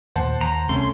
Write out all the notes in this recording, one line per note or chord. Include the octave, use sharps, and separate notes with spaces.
D#2 A#2 C5 F#5 A5
D#2 A#5
C2 A3 C4 C#4 C6